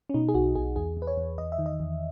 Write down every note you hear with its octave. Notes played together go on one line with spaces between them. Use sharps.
C#4
B2 D#4
G#4
B1 F#4
B1 G#4
E2 G#4
E2
B4
C#5
E2
E2 D#5
E5
D#3
D#5
E2